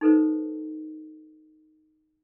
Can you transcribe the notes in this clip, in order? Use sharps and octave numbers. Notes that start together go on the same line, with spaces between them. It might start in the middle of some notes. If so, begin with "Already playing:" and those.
D#4 A4 B4 C5